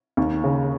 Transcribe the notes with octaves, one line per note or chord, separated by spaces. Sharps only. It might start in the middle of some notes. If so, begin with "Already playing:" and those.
D#2
C#3